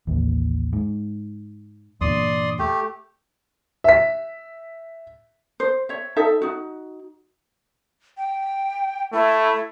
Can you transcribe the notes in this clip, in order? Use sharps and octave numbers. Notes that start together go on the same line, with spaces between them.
A1 D#2
G#2
E2 G2 A#2 D5 C6 D#6
A3 G4
E5 B6
C5
C#5 E5
D#4 A4 E5
D#4 F#4
G5
A3 E4